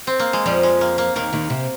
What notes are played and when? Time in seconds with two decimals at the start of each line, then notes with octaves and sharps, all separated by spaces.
0.07 C4
0.19 A#3
0.33 G#3
0.46 F2 F3 G3
0.63 G#3
0.81 A#3
0.98 A#3
1.16 D#2 D#3 A#3
1.33 D#2 D#3
1.50 C3